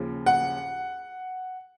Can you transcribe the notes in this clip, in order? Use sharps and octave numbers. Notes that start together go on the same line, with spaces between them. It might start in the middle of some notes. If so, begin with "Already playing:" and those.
Already playing: D#2 C#3 F3
F#5